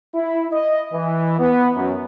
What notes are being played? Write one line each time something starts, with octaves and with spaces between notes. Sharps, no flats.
E4
D#5
E3
B3
F#2